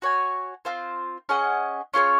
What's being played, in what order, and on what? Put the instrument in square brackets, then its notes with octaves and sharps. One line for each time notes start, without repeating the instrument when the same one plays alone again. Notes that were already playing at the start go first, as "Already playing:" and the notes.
[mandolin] F#4 C#5 G#5
C4 F4 C5
C#4 G#4 D#5 F#5
C#4 F4 G#4 C#5